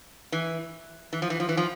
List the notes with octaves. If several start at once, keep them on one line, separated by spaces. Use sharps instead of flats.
E3
E3
F3
E3
F3
E3
F3